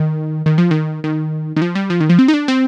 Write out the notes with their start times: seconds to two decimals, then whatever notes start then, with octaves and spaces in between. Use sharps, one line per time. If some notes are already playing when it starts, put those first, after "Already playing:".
Already playing: D#3
0.46 D#3
0.58 F3
0.71 D#3
1.04 D#3
1.56 D#3
1.62 F3
1.75 G3
1.90 F3
2.00 D#3
2.10 F3
2.19 C4
2.28 D#4
2.34 D4
2.48 C4